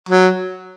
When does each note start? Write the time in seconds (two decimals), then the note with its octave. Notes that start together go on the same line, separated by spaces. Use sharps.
0.09 F#3